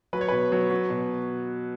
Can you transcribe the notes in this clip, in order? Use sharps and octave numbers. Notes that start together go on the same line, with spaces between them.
F#3 B4
C#5
B2 B4
F#3
F#3
B2